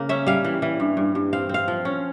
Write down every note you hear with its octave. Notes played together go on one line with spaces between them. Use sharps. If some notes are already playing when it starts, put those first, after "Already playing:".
Already playing: C#3 A#3
C#4 E5
G3 F5
E3
E3
G2
G2
G2
C4 F5
C4 F5
F3
C#4